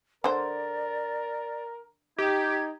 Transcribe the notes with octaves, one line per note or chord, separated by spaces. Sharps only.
D3 A#4 C5 D5
D#4 G4 G#6